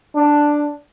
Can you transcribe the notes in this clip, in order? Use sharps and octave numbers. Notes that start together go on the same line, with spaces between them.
D4